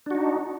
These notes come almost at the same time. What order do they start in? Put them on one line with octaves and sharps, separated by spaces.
D4 F#4 D#4